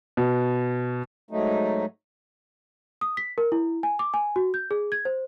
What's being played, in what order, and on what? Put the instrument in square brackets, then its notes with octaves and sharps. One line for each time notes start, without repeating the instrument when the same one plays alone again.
[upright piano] B2
[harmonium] G#2 F#3 A3 D#4
[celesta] D#6
B6
A#4
E4
G#5
D6
G#5
F#4
G6
G#4
G#6
C5